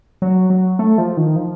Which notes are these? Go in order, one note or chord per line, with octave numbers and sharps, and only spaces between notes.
F#3
F#3
A3
F3
D#3
F3